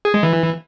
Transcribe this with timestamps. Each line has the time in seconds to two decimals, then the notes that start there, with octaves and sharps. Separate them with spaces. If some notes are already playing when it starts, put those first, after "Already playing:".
0.05 G#4
0.14 G#3
0.23 E3